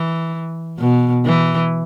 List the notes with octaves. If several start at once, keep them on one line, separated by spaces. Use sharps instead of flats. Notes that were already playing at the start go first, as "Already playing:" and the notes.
Already playing: E3
B2
E3